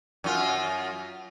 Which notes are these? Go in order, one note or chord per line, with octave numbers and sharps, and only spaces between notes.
F#2 F4